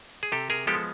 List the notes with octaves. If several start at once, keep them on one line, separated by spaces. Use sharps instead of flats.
G#4
C3 G4 A4
G#4 A#4
F3 G#3 B3 G4 A4